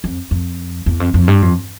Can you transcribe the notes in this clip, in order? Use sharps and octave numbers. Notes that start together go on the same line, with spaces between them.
F2
F2
E2
F2
F2
G2
F2